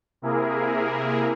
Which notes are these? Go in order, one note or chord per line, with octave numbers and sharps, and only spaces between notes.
C3 A#3 E4 G#4 A#4